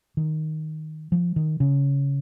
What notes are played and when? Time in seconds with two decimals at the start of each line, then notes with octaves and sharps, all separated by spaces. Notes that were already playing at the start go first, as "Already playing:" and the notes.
0.17 D#3
1.12 F3
1.36 D#3
1.60 C#3